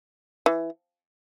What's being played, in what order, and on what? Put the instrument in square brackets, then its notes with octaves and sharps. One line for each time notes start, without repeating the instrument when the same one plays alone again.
[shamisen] E3